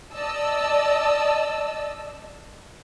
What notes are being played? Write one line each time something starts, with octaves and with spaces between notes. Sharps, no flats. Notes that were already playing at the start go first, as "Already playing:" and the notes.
D5 D#5 A5 E6